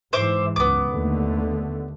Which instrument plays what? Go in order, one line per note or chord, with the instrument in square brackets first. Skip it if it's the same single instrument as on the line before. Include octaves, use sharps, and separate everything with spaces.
[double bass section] G#2 E3 [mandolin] C5 E5 D6
[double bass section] C#2 F#2 [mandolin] B3 D6
[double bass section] D#2 D3 A3